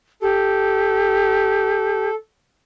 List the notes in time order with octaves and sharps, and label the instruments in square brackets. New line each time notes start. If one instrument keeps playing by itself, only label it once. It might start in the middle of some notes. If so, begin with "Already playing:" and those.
[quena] G4 [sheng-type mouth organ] A4